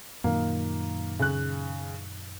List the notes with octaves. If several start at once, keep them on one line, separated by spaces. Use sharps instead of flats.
F#2 A#2 D#3 A#3
C#3 F#6